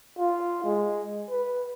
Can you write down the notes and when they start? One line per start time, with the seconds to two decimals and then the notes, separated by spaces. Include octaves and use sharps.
0.19 F4
0.64 G#3
1.30 B4